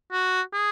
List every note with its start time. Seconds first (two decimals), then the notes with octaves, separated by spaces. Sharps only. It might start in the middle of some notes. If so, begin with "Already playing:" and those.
0.12 F#4
0.53 G#4